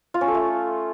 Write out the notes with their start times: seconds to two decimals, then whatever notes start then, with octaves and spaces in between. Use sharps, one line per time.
0.14 F4
0.21 C#4
0.28 A4
0.35 A3